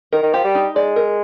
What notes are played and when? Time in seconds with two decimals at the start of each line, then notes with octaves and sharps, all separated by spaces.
0.12 D#3 A#4
0.23 D#3
0.33 F3 G4
0.44 G3
0.55 D#4
0.75 G#3 D5
0.96 A#4